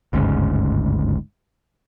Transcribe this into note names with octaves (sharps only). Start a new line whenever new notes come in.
G1 D2 G#2 C#3